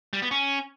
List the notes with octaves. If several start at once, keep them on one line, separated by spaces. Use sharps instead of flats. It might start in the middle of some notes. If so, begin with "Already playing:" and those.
G3
B3
C#4